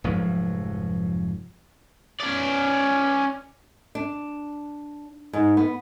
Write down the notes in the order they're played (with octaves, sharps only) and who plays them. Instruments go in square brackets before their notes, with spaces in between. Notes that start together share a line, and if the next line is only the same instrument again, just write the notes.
[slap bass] F1 G#2 F3 F#3
[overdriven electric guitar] C#4 D5
[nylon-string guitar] D4
G#2
B3